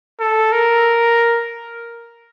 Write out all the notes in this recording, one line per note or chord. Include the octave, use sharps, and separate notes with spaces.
A4
A#4